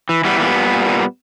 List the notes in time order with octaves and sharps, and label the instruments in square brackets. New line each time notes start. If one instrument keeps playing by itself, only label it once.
[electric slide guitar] E3
E3 G3 B3
A#2 G3 B3
A#2
A#2
A#2